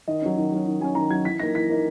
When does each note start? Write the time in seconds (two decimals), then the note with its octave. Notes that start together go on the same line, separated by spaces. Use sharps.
0.08 D#3 D#5
0.22 F#3 C#4
0.37 D#3
0.52 F#3 C#4
0.66 D#3
0.80 F#3 G#5
0.84 C#4
0.95 D#3 A#5
1.10 F#3 G#6
1.15 C#4
1.25 E3 B6
1.39 A#3 D#4 A#6
1.55 E3 B6
1.69 A#3 D#4